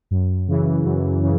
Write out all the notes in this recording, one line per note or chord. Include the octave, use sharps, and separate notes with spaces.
F#2
C#3 E3
F#2
C#3 E3